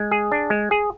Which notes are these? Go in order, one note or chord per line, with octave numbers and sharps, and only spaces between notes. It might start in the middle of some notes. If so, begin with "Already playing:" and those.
Already playing: G#3
G#4
D4
G#3
G#4